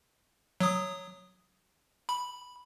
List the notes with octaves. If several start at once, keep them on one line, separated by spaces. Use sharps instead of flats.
F#3 D#6
B5